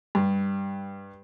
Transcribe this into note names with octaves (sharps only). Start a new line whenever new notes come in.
G2